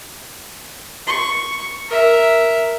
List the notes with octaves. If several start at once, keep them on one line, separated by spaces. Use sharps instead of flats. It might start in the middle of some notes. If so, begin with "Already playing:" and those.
C#6
A#4 E5